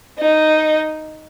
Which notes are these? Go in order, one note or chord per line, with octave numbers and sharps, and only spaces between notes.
D#4